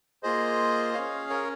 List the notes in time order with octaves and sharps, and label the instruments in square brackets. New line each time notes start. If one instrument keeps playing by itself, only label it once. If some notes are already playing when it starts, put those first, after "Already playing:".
[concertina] A#3 F4 G#4 C5 D#5
C#4 G#4 C#5 F5
A#4 C#5